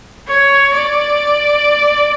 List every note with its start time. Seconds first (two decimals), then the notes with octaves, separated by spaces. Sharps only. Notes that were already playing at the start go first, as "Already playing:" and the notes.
0.28 C#5
0.75 D5